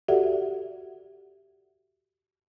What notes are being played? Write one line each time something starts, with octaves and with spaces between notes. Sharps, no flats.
F#4 G4 A4 D5 E5 F#5